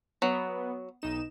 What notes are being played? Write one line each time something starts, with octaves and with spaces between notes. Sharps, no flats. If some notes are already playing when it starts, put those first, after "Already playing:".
F#3 B3
B1 D#4 E7